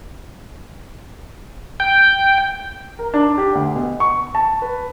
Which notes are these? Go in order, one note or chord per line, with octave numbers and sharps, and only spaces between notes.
G5
A#4
D4
G4
D2
B2
C#6
A5
B4